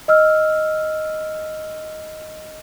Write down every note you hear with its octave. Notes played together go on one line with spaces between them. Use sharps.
D#5 E6 F6